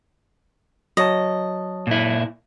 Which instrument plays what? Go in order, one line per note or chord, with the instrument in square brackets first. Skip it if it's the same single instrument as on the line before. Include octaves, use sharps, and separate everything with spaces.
[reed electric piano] F#3 C#5 A5 [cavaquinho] D#5
[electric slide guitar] A#2 E4